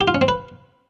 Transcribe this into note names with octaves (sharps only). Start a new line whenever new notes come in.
G4
F4
C#4
C4
B4